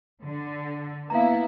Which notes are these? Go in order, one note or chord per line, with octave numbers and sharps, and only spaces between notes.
D3
A#3 B3 E4 F5 A#5